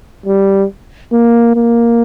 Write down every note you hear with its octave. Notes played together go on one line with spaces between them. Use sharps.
G3
A#3
A#3